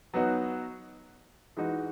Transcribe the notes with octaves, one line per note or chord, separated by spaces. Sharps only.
F#3 B3 D#4 F#4
E3 G#3 D#4 F#4